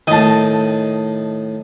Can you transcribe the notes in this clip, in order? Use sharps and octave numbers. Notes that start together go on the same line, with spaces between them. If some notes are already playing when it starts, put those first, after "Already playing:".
A2 D#3 D#5 A5